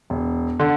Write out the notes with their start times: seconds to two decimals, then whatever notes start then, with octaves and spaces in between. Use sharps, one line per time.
0.10 E1
0.60 D3